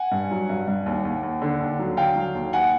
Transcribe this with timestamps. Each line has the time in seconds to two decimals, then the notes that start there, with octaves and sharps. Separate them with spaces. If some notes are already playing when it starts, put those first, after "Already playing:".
Already playing: F#5 G#5
0.12 G2
0.31 F#3
0.49 G2
0.68 G2
0.86 D#2
1.05 D#2
1.23 D#2
1.42 D3
1.61 D#2
1.79 F#3
1.97 D3 F5 G5
2.16 F#3
2.35 D#2
2.53 D#2 F#5 G#5